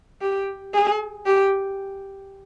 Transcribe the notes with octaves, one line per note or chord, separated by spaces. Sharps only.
G4
G#4
G4